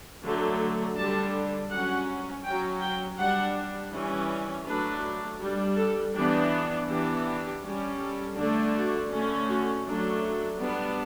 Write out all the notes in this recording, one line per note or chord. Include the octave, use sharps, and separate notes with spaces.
D3 F#3 A3
D3 G3 D4 A5
F#3 C#4 F#5
F#3 C#4 G5
G5
G3 D4 F#5
E3 G3 C#4
F#3 A3 D4 B4
G3 D4
A4
E3 B3 D4 G4
E3 B3 D4 G4
G4
G3 C#4
A4
D3 A3 D4
F#4
D3 A3 C#4
F#4
F#3 A3 D4
G3 B3 D4